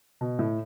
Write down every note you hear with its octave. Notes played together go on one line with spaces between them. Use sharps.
B2
A2